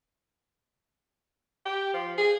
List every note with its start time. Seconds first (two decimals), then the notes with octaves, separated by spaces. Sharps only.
1.66 G4
1.94 F3
2.18 G#4